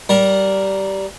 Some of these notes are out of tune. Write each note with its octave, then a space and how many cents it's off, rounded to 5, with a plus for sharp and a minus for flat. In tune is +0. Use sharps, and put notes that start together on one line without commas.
G3 -15 A#4 +0